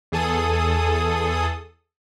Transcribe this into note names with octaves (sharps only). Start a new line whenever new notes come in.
E2 G#4 A4 D#6